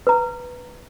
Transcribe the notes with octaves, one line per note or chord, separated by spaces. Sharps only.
B4 A#5